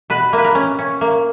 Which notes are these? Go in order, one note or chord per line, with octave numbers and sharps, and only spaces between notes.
B2 B4
A#3
B4
A#4
C#4
C#4
A#3